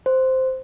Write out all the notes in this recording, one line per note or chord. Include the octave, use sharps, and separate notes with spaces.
C5